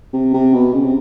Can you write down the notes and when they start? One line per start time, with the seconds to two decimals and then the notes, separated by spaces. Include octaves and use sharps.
0.13 C3
0.33 C3
0.53 B2
0.73 C#3
0.84 C3